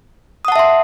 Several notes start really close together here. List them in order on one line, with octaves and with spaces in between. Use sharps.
D#6 F#5 A5 E5 C6